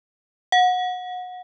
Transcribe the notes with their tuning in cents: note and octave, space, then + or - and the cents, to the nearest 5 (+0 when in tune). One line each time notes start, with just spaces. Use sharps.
F#5 -25